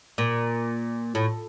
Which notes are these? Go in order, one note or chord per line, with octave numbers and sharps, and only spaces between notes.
A#2
A2